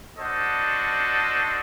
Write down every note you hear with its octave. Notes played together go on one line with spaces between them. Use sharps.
D4 F#4 A4 C5 D#5